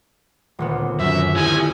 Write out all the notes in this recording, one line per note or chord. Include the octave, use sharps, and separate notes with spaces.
D#1 D2 B3
F#2 E5
E4 G4 C5 G#5